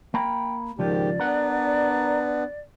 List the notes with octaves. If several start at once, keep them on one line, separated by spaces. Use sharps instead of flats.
A#3 G5 A#5 B5
C#2 G#2 D#3 F3 G4 D5
B3 D4 A#4 B4 F#5